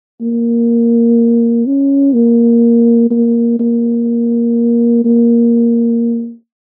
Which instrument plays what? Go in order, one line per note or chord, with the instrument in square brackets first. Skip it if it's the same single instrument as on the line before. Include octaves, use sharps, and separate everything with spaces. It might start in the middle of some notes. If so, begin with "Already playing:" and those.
[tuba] A#3
C#4
A#3
A#3
A#3
A#3